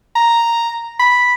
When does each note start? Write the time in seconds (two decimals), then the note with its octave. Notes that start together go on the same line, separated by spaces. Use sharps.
0.16 A#5
1.00 B5